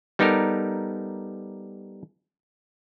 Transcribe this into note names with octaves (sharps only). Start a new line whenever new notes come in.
G3 B3 D#4 G4 A4 A#4